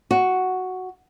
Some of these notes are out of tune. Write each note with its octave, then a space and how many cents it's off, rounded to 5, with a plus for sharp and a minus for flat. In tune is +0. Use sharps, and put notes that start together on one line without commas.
F#4 +0